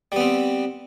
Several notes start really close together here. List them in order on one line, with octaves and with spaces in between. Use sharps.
G3 B3 C4